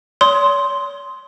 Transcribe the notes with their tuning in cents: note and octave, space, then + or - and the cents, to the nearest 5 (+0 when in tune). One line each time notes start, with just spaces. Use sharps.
C#5 +40 C6 +0 D#6 +25